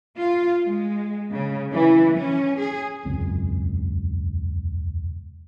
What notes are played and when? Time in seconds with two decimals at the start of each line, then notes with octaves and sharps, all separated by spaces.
0.18 F4
0.67 G#3
1.32 C#3
1.72 E3
2.19 C#4
2.59 G#4
3.05 E1 C#2 F#2 C4